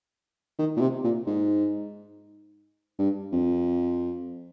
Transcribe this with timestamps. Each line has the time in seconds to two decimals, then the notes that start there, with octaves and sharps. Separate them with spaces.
0.59 D#3
0.76 A#2
0.81 C3
1.04 A#2
1.27 G#2
2.99 G2
3.32 F2